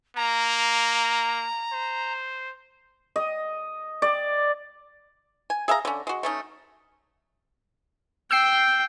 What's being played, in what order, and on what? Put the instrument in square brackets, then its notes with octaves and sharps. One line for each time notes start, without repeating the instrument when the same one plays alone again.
[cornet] A#3 [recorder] A#5
[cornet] C5
[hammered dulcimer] D#5
D5
[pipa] G#5
G#4 E5 F5 A#5
D3 C#4
G#3 F#4
A3 C#4 D#4
[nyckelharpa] G5 [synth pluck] E6 G6 C7